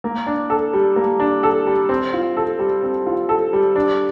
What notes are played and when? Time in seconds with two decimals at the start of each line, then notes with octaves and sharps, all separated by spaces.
0.04 A#3
0.26 D4
0.50 A4
0.73 G3
0.96 A#3
1.20 D4
1.43 A4
1.67 G3
1.89 C4
2.13 F4
2.37 A4
2.59 G3
2.83 C4
3.07 F4
3.29 A4
3.53 G3
3.76 D4